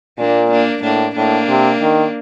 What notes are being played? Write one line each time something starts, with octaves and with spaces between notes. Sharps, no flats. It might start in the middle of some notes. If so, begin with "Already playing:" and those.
A#2 A#3 D4
A#3 D4
A2 A#3 D4
A2 A#3 D4
C3
D#3